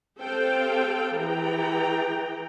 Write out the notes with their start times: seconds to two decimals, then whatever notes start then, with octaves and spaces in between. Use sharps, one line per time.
0.20 C4 G4 A4 C5 F5 G5
1.13 E3 G#4 G5 A#5